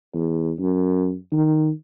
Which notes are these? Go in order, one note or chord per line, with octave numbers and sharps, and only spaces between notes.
E2
F#2
D#3